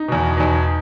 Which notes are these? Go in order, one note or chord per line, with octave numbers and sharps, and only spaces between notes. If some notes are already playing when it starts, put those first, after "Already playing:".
Already playing: D#4
E2 B2
E2 B2 D#4